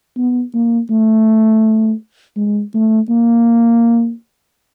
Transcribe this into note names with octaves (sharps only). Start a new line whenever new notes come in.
B3
A#3
A3
G#3
A3
A#3